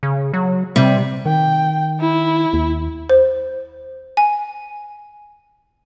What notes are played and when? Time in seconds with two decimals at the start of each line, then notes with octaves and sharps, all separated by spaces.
0.03 C#3
0.33 F#3
0.76 C3 G3
1.26 D#3 G5
2.00 E4
2.53 D#2
3.10 C5
4.17 G#5